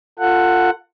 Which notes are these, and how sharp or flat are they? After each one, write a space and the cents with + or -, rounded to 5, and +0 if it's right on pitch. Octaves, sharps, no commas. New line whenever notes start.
F4 +0 A4 +35 F#5 +0